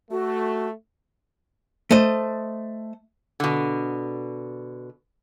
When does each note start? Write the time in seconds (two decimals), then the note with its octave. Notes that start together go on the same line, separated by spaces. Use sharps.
0.11 A3 F#4
1.91 A3 C5 D#5
3.40 B2 D3